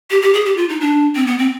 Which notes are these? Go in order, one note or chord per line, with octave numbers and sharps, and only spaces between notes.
G4
G4
G#4
G4
F4
D#4
D4
C4
B3
C4